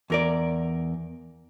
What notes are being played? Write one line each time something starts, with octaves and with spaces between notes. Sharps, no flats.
E2 A#4 D5